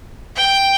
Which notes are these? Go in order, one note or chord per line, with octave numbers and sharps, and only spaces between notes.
G5